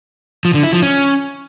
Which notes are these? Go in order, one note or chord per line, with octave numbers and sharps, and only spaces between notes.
F3
D3
E4
F3
C#4